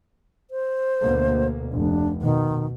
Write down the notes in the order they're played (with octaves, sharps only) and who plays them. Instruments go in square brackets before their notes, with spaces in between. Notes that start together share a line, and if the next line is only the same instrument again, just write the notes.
[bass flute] C5
[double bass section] D2 B2 A#3
[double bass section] F1 [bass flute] D4
[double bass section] B2 [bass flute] D#3